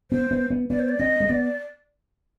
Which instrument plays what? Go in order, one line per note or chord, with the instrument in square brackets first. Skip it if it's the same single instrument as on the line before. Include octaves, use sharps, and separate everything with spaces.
[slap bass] B3 [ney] C5
[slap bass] B3
B3
[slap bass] B3 [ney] D5
[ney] C5
D5
[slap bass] C4 [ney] D#5
[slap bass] G#3
[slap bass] B3 [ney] D5